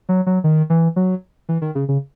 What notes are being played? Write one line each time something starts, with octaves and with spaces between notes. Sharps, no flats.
F#3
F#3
D#3
E3
F#3
E3
D#3
C#3
C#3